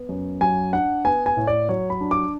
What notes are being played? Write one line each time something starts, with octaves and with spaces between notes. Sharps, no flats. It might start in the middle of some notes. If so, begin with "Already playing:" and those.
Already playing: B3
F#2
F#3 G#5
D4 F#5
B3 G#5
G#5
A2
D5
F#3 C#5
B5
D4
D6